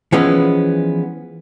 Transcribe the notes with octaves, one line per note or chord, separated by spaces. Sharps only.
E3 F3 G#3 B3 C#4